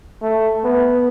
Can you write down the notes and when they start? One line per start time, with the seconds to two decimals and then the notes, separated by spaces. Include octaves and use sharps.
0.22 A3
0.64 B3